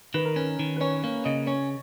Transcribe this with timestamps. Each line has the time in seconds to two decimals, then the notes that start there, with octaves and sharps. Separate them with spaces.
0.14 D#3 B4
0.25 A#4
0.36 C#4 B4
0.59 D#3
0.76 B4
0.81 C#4 C#5
1.03 A#3 C#5
1.25 C#3 D#5
1.47 C#4 C#5